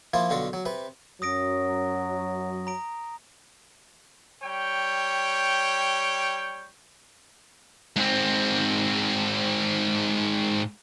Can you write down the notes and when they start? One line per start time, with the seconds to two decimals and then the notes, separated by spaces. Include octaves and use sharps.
0.14 F3 A#3 E4 F4
0.30 B1 D3 F4 F#4
0.53 F#3
0.65 C3 B4
1.22 F#2 F#3 D#6 A#6 D7
2.67 A#5 D7
4.42 G3 C#5 G5
7.97 G#2 C4